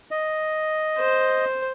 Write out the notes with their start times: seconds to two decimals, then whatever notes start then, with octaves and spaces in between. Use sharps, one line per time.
0.11 D#5
0.98 C5